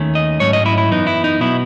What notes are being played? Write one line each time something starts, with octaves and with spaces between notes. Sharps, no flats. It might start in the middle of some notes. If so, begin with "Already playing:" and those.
Already playing: D#2 D#3 A3 C#4
D#5
G#2 F#3 A3 C#4 C#5
D#5
E4
E4
F#2 E3 B3 D#4
E4
D#4
B2 F#3 B3 E4